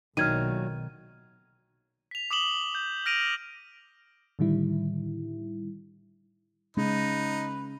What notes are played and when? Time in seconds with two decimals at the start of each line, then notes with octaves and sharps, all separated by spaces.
0.17 B1 A#2 D#3 F#3 A3 F6 G#6 D#7
2.11 B6 F7
2.31 D6 D#6 E7 F#7 G7
2.75 G6
3.06 F6 A#6 D7 D#7 F7
4.39 A2 D3 D#3 G3 E4
6.77 C#3 G#3 D#4 B4